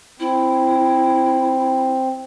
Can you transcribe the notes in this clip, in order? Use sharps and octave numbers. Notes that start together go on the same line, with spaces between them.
C4 E4